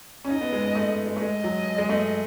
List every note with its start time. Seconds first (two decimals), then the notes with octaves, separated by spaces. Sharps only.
0.24 C#4
0.30 D#4 D#5
0.41 B3
0.52 G#3
0.64 G#3
0.75 A3
0.91 G#3
1.06 G#3
1.17 A3
1.21 G#3 D#5
1.44 F#3
1.78 G#3
1.89 A3